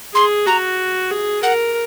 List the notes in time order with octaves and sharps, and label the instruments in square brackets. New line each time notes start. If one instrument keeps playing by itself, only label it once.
[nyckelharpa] G#4 [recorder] C6
[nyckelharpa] F#4 [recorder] A#5
[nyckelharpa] G#4
[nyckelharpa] A#4 [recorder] F#5